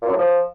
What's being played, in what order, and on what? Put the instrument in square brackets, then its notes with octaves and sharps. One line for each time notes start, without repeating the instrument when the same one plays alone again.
[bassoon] A#2
F#2
A2
F3